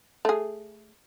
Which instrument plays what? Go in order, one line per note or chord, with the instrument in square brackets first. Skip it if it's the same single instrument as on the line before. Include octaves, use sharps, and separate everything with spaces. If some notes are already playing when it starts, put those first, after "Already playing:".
[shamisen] A3 G#4